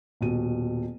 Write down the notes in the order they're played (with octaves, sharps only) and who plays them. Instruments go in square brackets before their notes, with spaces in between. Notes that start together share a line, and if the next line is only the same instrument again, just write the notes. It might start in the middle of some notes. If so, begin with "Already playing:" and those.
[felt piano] D#1 B2 D#7